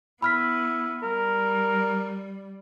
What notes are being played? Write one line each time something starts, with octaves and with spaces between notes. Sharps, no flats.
B3 E4 B5 F6 B6
G3 A#4